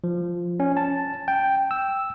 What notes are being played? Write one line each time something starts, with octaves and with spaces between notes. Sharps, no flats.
F3
C#4
A5
G5
E6